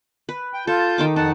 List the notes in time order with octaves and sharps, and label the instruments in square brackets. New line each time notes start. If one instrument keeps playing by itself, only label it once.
[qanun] B4
[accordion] G5
[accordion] F4 A5 G6 [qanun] A4
[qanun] D#3 D#4 D6
[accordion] F2 F#5 A5 [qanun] D#4